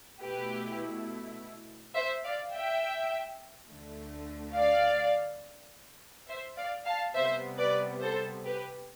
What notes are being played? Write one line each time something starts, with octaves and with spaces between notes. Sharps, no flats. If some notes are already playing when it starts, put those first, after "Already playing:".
B2 A3 E4 G4 B4
C5 E5
D5 F5
E5 G5
D2 D3 A3
D5 F5
C5 E5
D5 F5
F5 A5
C3 G3 B3 C5 E5
B4 D5
A4 C5
G4 B4